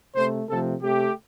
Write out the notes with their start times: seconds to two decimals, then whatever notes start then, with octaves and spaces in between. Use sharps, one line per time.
0.15 C3 A3 C5
0.49 C3 F3 A3 A4
0.82 C3 A3 G4